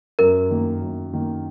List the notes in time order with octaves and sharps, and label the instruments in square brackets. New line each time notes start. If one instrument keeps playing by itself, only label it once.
[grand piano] F#2 [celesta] A#4
[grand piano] D#3 A#3
F#2
D#3 A#3